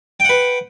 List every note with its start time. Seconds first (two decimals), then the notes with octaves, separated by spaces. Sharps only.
0.20 G5
0.25 F#5
0.29 B4